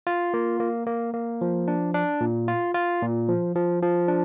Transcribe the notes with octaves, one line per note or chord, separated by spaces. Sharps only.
F4
A#3
A#3
A#3
A#3
F3
D4
D4
A#2
F4
F4
A#2
F3
F3
F3
D4